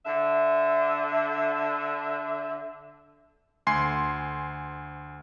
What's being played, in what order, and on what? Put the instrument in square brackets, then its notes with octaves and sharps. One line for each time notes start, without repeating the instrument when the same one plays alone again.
[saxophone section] D3 E5
[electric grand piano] D2 G#5 C6 C7